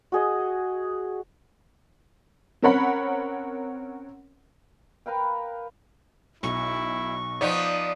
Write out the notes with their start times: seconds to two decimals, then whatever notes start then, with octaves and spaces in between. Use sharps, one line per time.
0.12 F#4 G#4 D#5
2.62 C4 C#4 A#4 C#5 F#5 B5
5.06 A#4 B4 F5 G5
6.43 B1 E4 C#6
7.41 F3 B3 D#4 D5 D#6